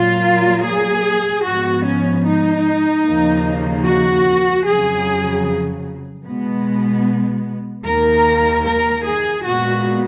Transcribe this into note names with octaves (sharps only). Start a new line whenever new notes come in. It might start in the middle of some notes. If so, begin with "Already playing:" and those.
Already playing: A#2 F#3 A#3 F4
G#4
G#2 F3 B3 F#4
C#4
D#4
D#2 C#3 F3 A#3
F#4
F2 C#3 F#3 G#4
B2 G#3 B3
D#2 D#3 A#3 A#4
A#4
G#4
A#2 G#3 B3 F#4